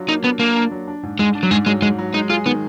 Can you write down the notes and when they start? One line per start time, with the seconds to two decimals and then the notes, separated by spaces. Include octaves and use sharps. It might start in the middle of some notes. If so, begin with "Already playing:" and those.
Already playing: F#3 D4 F4
0.08 A#3 D#4
0.23 B3 D4
0.39 A#3 D4
0.56 D4
0.71 F#3
0.88 D4
1.03 G#2
1.19 G#2 G#3
1.35 D4
1.43 F#3
1.51 G#2 G#3
1.66 F#3 G#3
1.82 G#2 G#3
1.98 F#3
2.14 G#3 D#4
2.30 F4 G#4
2.46 D#3 B3